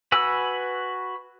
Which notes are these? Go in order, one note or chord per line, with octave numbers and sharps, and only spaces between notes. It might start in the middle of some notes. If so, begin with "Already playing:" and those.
F#4 B4 G#5 E6